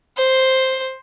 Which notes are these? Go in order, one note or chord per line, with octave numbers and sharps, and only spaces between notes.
C5